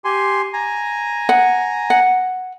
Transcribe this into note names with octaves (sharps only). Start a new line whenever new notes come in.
G4 G#5 C6
G#5 A#5
F#5
F#5